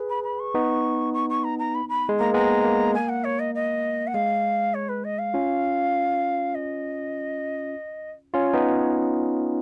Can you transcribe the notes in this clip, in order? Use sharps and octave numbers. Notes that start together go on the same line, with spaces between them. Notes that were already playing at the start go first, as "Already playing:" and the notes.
Already playing: G#4 B4
B5
B5
C#6
B3 D#4
C#6
C#6
A#5
A#5
B5
B5
G#3
A#3 A#5
G#3 B3 A#5
A#3
G#5
F#5
C#5
D#5
D#5
F#5
G#3 F5
C#5
B4
D#5
F5
C#4 F4
D#5
C#4 F4 C#5
B3 D#4